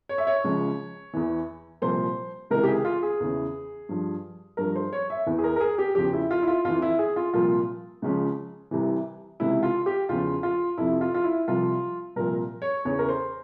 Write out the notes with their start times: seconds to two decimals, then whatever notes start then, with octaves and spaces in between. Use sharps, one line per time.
0.09 C#5
0.18 E5
0.27 C#5
0.44 C#2 C#3 F3
1.14 E2 E3
1.82 C2 A#2 F3 C5
2.50 C#2 C3 E3 A#4
2.63 G4
2.68 G#4
2.85 F4
3.03 G#4
3.20 E2 C#3 E3
3.89 G2 F3
4.57 G2 F3 A#4
4.76 C5
4.93 C#5
5.10 E5
5.26 E2 E3
5.39 G#4
5.44 A#4
5.56 A#4
5.61 G#4
5.78 G4
5.95 E2 C#3 F3 G4
6.13 E4
6.31 F4
6.43 E4
6.48 F4
6.65 F2 E3 F4
6.82 E4
6.99 G#4
7.16 F4
7.34 C2 A#2 F3 F4
8.02 C#2 C#3 F3
8.71 C2 C3 E3
9.40 C#2 C3 E3 E4
9.63 F4
9.86 G4
10.09 E2 C#3 F3 F4
10.43 F4
10.78 F2 C3 F3 E4
11.01 F4
11.14 F4
11.24 E4
11.48 C2 C3 F3 F4
12.16 C2 A#2 F3 A#4
12.62 C#5
12.85 E2 C#3 E3 C#5
12.99 A#4
13.09 C5